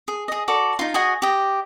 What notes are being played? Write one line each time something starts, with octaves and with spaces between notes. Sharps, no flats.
G#4
G#4 D#5
F#4 A4 D5
D#4 F4
F#4 G#4 D#5 G#5
G4 D#5